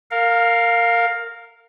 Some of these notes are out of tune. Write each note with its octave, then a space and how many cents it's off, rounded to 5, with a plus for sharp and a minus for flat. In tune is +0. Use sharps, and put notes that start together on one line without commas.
A#4 -15 F5 +10